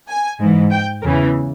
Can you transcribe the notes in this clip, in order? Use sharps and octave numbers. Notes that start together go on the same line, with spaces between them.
G#5
G#2 E3
G5
E2 C#3 E3 A#4